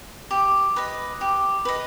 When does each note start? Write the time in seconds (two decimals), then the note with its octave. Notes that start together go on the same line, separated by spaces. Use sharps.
0.31 G4
0.76 B4 D#5
1.21 G4
1.65 B4 D#5